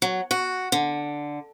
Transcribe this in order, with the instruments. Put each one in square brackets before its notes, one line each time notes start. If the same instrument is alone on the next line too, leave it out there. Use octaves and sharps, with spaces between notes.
[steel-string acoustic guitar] F#3
F#4
D3